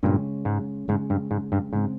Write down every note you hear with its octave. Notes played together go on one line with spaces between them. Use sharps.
G2 A#2 C#3 G#3 C#4
G#2
G#2 C#3 G#3 C#4
G2
G#2
G2
G#2 C#3 G#3 C4